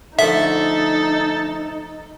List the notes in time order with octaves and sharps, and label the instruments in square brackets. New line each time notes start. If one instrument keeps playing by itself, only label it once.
[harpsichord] D3 F3 A3 [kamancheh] D#4 [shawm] A4 [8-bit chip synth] E5